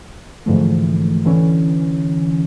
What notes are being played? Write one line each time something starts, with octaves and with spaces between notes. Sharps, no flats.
G#2 D3 E3 F3 A3
D3 E3 C#4